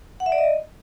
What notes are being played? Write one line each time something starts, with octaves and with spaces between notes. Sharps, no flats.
F#5
E5
D5
D#5